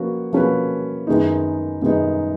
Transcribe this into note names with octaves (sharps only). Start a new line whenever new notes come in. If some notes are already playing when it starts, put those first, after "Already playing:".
Already playing: F3 A#3 C#4 F#4 B4
F3 A#3 C#4 F#4 B4
F#2 D#3 G#3 B3 D#4
F#2 D#3 G#3 B3 D#4